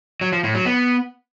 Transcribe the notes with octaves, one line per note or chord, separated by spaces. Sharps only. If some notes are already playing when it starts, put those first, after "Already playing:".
F#3
F3
A2
F#3
B3